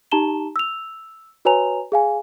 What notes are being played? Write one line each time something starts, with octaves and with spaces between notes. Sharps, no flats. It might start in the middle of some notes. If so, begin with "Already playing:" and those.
D#4 G4 A5 A#5 E7 G7
E6 F7
F#4 B4 C#5 G#5 A#5 F7
G#4 F5 G#5